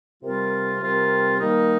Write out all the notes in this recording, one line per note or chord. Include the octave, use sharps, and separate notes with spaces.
C3 G3 C4 F4 A#4
C3 G3 C4 F4 A#4
D#3 G3 A#3 D#4 A#4